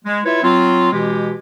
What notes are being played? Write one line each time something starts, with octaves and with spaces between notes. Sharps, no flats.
G#3
E4 F4 B4 C#5 E5
F#3 C4 F4
B2 E3 G#3 G4